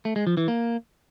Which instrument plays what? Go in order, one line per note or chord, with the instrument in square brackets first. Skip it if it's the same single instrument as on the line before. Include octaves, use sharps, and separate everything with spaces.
[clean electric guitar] A3
G#3
F3
E3
A#3